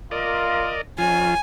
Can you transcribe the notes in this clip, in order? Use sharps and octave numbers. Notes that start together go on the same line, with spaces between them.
A#3 F4 A#4 D5 D#5
F2 F3 C#4 F4 G#5